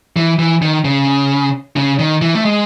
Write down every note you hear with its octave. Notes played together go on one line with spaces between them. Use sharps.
E3
E3
D#3
C#3
C#3
D#3
E3
A3
G#3